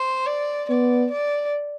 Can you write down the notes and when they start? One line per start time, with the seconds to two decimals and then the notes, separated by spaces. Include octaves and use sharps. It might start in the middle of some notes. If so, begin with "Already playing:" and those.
Already playing: C5
0.27 D5
0.69 B3 D5
1.11 D5